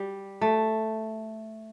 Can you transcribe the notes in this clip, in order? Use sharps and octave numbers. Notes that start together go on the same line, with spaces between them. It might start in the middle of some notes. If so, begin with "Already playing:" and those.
Already playing: G3
A3